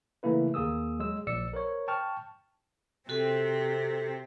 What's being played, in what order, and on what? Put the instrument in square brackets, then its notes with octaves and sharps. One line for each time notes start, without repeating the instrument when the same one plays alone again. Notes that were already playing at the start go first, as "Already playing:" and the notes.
[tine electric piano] C#3 E3 A3 A#3 E4 B4
D#2 A#3 G#4 D#6 E6
F#3 G#3 E6
A#1 D5 E6 C#7
A#4 C5 C#5
G5 A5 C#6 F6
[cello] C3 C4 [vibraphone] F#4 A4